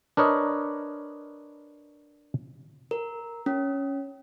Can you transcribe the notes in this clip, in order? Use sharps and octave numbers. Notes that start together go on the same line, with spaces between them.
D4 A#4 B4 C#5 D#5
A#4
C#4